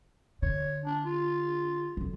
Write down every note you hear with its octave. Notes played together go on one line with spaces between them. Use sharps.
D3 C#5
D4
F4
D3 F#3